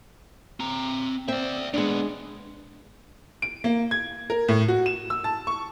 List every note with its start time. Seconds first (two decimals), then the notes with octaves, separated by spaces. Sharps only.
0.60 C4 A#5
1.28 C4 D5 E5
1.74 A#2 G#3 B3 D4
3.42 D7
3.64 A#3
3.91 G#6
4.30 A#4
4.48 A2
4.68 F#4
4.86 E7
5.10 E6
5.24 A5
5.47 C#6